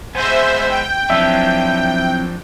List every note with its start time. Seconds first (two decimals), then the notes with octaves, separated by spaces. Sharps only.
0.15 G#3 B3 C5 E5 G#5
0.69 G5
1.10 F3 F#3 C4 D4 E4 E5